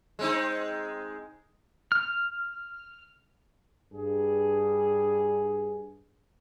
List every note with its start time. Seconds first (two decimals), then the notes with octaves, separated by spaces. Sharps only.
0.19 G#3 C4 D#4
1.92 F6
3.93 G2 G#4